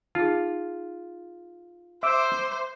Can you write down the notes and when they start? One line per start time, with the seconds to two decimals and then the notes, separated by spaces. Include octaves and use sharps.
0.15 D#4 F4 G#4
2.03 C5 E5 D6 E6